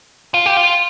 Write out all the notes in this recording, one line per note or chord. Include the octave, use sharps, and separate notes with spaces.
F4
G4
F4